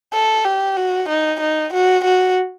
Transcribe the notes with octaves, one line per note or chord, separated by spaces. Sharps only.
A4
G4
F#4
D#4
D#4
F#4
F#4